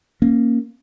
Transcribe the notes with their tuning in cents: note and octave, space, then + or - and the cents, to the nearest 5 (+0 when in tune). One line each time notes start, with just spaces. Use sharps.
A#3 +0 C#4 -15